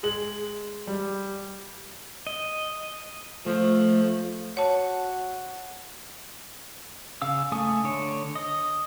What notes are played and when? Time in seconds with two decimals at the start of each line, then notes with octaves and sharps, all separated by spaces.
0.03 G#3 G#4 F#7
0.87 G3
2.27 D#5
3.46 F3 A3
4.57 F#4 C#5 A5
7.22 C#3 F5 E6
7.52 A3 A4 G#5 D#6
7.84 D3 C#5
8.36 D#5